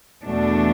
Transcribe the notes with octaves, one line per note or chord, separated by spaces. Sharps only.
E2 B2 A3 D4